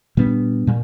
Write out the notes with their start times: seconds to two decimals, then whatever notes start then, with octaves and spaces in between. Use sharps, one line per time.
0.17 A#2 G3 B3 D4
0.67 A#2 G3